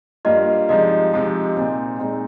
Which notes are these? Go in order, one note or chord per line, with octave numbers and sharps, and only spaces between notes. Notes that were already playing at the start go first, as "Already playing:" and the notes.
G2 G3 A#3 F4 D#5
C3 F3 G#3 D#4 D#5
C3 F3 G#3 D#4
A#2 G#3 C4 D#4
A#2 G#3 C4 D#4